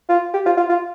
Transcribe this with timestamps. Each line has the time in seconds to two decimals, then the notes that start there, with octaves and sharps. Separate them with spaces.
0.09 F4
0.34 G4
0.46 F4
0.57 F4
0.69 F4